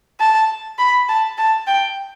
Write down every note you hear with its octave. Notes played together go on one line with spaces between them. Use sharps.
A5
B5
A5
A5
G5